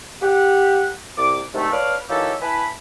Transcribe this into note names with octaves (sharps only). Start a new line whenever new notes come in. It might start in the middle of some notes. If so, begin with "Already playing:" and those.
G4 F#5
C2 D6
D2 G#2 C3 D#3 A3
A4 B4 C#5 D5 F5 F6
E3 F#3 A#3 D#4 G4 A4
E4 B4 G#5 A5 B5